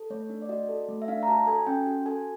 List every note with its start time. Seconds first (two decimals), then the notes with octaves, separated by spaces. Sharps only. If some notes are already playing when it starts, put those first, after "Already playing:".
Already playing: A4
0.10 A3 C#5
0.30 D4
0.42 D5
0.49 F#4 D#5
0.69 A4
0.89 A3
1.02 E5
1.08 D4 F5
1.23 A#5
1.28 F#4 A5
1.47 A4 G#5
1.66 C#4 G5
1.87 F#4
2.06 A4 G#5